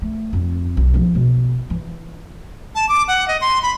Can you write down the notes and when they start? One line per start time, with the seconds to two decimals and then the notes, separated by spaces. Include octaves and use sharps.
0.02 A3
0.33 F2
0.77 B1
0.94 F3 D#4
1.15 B2
1.70 E3
2.75 A5
2.89 D6
3.08 F#5
3.28 D#5
3.41 C6
3.62 B5